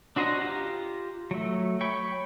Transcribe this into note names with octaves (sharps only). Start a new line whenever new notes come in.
D4 F#4 C5 D#5 A#5
F4 G4 A#5
F#3 A3
C#5 G5 B5 C#6